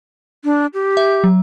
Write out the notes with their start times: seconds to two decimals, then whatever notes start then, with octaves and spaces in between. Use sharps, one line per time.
0.45 D4
0.74 G4
0.97 E5
1.24 F#3